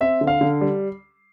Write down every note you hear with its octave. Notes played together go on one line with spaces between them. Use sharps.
C4 E5
D3
F5
D3
G3